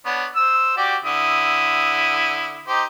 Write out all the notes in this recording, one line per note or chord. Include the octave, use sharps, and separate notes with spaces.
B3 D4 C#5
C5 E6
F#4 G4 D5
D3 E4 D#6
D#4 G4 C5